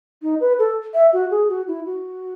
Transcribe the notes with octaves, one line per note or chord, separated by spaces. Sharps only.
D#4
B4
A4
E5
F#4
G#4
F#4
E4
F#4